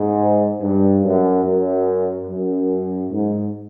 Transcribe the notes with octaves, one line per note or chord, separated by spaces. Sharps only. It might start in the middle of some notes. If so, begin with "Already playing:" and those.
Already playing: G#2
G2
F#2
F#2
F#2
G#2